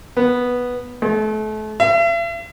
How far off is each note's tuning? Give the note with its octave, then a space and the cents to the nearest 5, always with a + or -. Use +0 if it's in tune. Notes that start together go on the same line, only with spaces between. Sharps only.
B3 -5
A3 -35
E5 +45